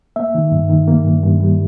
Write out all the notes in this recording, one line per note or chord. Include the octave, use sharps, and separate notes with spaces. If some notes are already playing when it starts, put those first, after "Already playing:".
A#3 E5
D#3
G2
D#3
A#3
G2
G2
G3